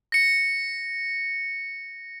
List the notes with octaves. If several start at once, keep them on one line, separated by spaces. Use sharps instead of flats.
A#6 C#7